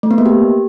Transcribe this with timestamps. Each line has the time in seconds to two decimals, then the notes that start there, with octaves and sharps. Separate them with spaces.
0.03 A3
0.11 B3
0.18 A#3
0.26 G4